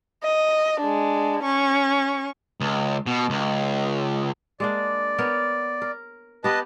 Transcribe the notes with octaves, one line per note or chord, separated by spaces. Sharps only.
D#5
G#3 D4
C#4 C#6
C#2
B2
C#2
G#3 A#3 D4 D5
B3 A#4 C#5
A#4
B3 G4 B4 D#5 A5